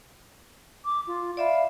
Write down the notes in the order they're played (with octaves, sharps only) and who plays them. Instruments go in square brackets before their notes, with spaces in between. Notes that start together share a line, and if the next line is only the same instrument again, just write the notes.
[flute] D6
F4
[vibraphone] D5 E5 B5 [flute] F5